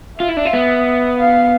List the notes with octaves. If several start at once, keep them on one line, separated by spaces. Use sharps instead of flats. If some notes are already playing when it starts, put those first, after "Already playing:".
F4 E5
E4
D4
F4
B3
F5